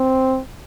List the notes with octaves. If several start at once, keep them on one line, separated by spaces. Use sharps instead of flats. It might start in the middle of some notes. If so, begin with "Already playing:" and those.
Already playing: C4